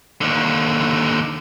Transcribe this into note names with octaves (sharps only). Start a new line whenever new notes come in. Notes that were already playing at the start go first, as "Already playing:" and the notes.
D#2 D3